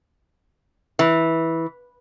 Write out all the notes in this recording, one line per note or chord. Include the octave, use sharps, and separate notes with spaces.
E3